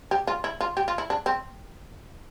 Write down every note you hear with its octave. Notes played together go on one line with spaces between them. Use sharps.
G4
F4
E4
F4
G4
F4
E4
D4
C4